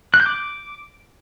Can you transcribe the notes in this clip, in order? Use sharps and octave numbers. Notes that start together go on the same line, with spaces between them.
F#6
G6
D6